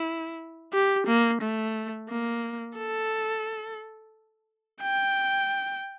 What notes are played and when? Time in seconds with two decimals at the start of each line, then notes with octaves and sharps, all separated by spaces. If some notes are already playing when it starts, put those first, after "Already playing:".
Already playing: E4
0.73 G4
1.06 A#3
1.41 A3
2.08 A#3
2.77 A4
4.82 G5